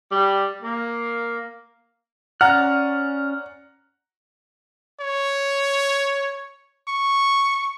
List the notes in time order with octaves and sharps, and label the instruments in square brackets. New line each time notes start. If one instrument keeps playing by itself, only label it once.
[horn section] G3
A#3
[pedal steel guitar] C#4 D5 F#6 [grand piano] F#5 A#5 [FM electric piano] F6
[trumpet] C#5
C#6